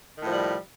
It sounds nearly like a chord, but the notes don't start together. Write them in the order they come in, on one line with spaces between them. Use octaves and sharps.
D#3 A2 F3 G3